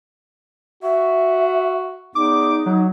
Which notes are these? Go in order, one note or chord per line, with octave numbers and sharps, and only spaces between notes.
F#4 E5
E2 D#4 D6
F#3